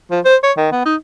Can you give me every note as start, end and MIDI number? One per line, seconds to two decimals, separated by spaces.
0.11 0.20 53
0.25 0.36 72
0.43 0.52 73
0.57 0.68 51
0.71 0.84 59
0.85 0.95 63